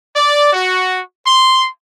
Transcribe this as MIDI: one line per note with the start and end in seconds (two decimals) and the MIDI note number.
0.16 0.52 74
0.52 0.99 66
1.25 1.66 84